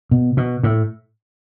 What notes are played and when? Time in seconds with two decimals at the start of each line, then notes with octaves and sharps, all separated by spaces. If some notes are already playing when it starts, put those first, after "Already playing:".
0.11 B2
0.37 B2
0.63 A2